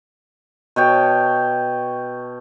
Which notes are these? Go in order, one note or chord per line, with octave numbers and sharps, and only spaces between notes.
B2 C#5 G5 A5